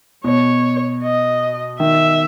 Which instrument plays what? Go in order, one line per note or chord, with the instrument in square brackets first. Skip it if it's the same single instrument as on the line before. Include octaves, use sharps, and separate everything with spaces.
[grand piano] B2 [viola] C#5
[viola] D#5
[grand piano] D#3 [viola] E5